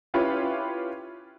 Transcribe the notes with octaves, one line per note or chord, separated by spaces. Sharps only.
C#4 E4 F4 G4 B4 C#5